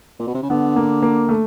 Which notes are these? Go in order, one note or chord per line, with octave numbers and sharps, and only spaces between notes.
A#2
B2
C3
C#3
D3 B3
A#3
A#3
A3